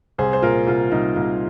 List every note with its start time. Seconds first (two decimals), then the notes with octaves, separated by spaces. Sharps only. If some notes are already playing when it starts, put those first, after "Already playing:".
0.18 C2 G#4 C5
0.33 C5
0.42 A#2 F4 A#4
0.67 C2 F4
0.92 C2 D#4
1.16 C2 F4